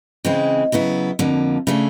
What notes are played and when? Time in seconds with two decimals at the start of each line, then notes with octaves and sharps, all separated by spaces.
0.25 C#3 E3 G#3 C4
0.72 C#3 F#3 B3 E4
1.19 F2 D3 F3 A#3
1.67 C#3 E3 A3 D4